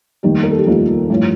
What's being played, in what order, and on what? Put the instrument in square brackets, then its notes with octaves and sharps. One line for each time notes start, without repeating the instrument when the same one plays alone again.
[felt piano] F1 D#2 D#3 G3 G4
A#4
A4
G4
F1 D#2 D#3 G3 F4
A1 G2 F3